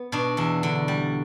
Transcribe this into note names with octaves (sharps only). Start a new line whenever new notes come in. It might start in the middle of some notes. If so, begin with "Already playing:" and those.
Already playing: B3
B2 D4
E2 E4
D3
G3